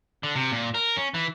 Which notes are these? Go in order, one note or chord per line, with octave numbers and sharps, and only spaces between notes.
D3
C3
A#2
A#4
C#4
E3